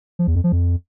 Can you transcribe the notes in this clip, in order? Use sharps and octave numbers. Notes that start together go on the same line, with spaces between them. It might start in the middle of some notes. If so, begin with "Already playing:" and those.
F3
E2
F2
F3
F2